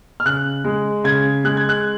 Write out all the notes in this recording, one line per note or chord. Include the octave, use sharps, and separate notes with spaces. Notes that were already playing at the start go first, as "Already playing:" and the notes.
F6
C#3 F#6
G#3
C#3 G#6
G#3 F#6
G#6
F#6